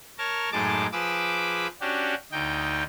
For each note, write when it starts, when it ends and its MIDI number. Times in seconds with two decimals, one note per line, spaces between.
0.18 0.50 70
0.18 0.50 73
0.18 0.50 81
0.18 0.50 82
0.52 0.87 42
0.52 0.87 45
0.52 0.87 56
0.52 0.87 63
0.52 0.87 81
0.52 0.87 86
0.92 1.67 53
0.92 1.67 68
0.92 1.67 71
0.92 1.67 86
0.92 1.67 88
1.81 2.14 61
1.81 2.14 62
1.81 2.14 66
1.81 2.14 67
2.31 2.83 38
2.31 2.83 63
2.31 2.83 79